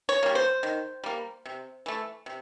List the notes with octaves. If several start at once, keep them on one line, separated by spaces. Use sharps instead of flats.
C#5
G3 A#3
C5
D#3
G3 A#3
C3
E3 A3
C3